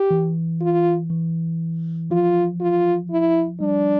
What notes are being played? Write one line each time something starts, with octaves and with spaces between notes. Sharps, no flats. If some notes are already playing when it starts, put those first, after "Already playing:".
Already playing: G4
E3
F4
E3
F3 F4
F4
E4
G3 D4